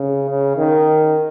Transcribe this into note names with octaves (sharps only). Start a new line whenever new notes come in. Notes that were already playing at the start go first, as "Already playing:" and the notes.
Already playing: C#3
C#3
D#3